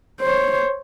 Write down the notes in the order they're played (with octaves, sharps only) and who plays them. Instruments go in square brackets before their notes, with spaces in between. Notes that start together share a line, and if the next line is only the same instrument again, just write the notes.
[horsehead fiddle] C5 C#5